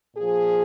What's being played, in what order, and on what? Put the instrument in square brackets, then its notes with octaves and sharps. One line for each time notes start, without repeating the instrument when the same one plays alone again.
[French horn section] A#2 F3 G#4